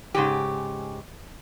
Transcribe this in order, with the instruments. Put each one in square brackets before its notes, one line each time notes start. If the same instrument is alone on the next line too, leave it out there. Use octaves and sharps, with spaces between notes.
[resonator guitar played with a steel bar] G#2 C#3 G4